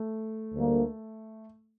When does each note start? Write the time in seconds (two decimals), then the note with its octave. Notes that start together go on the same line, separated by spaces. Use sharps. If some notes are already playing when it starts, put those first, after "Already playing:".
Already playing: A3
0.53 D2 D3 G3 A#3